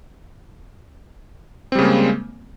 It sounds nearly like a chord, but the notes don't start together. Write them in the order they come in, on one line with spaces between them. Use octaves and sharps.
C4 G3 C#3 A#3 G#3